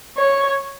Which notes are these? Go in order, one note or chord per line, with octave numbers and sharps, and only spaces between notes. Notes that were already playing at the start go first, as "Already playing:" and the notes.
C#5